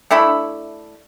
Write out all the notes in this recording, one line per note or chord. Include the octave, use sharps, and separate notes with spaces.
A3 D4 E4 B5